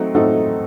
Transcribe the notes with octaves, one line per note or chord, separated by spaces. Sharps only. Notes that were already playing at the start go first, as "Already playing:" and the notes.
Already playing: F#3 A3 C4 D#4
F#3 A3 C4 D#4